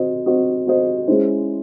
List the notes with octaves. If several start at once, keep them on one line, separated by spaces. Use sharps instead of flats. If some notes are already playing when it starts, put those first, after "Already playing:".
Already playing: C4 F#4 C5 D#5
C4 F#4 C5 D#5
C4 F#4 C5 D#5
G#3 C#4 E4 C5